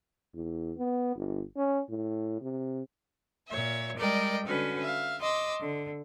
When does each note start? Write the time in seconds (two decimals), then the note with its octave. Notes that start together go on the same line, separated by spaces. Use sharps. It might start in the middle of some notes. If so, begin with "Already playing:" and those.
0.35 E2
0.78 B3
1.16 G1
1.57 C#4
1.90 A2
2.42 C3
3.48 A#2 C#5 E5
3.97 G3 G#3 A#4 D5 D#5 G5
4.47 D3 C#4 F#4 B4
4.81 E5 F5
5.20 D#5 C6 D6 E6
5.62 D3